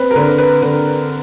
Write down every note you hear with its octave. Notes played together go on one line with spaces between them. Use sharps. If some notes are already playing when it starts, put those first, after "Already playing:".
Already playing: C4 B4
A#4
D3 B4
B4
D3 B4